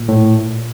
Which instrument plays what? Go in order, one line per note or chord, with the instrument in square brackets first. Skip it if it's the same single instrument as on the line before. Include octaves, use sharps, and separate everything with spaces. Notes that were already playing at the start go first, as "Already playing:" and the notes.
Already playing: [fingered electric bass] A#2
[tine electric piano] A2